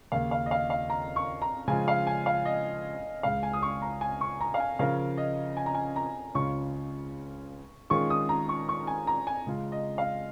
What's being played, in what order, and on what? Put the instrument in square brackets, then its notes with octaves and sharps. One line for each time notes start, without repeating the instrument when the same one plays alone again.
[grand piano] D#2 C#3 A#3 [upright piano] F5
[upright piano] F5
D#5
F5
F5
A#5
C#6
A#5
[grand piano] C#3 F3 G#3 F4 [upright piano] G#5
[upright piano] F5
G#5
F5
D#5
[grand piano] C#2 C#3 G#3 [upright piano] F5
[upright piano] G#5
D#6
C#6
A#5
G#5
C#6
A#5
F5
G#5
[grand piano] C#3 F3 C#4 A#4 [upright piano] F5
[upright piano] D#5
G#5
A#5
G#5
A#5
[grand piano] C#2 C#3 G#3 C#4 F4 [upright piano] C#6
[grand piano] D#3 G#3 C#4 F4 G#4 [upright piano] C#6
[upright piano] D#6
A#5
C#6
C#6
G#5
A#5
G#5
[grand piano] C#3 G#3 F4
[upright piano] D#5
F5